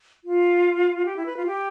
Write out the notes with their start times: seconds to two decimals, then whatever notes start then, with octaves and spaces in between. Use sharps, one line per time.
0.24 F4
1.05 G4
1.17 E4
1.26 B4
1.37 F4
1.46 G4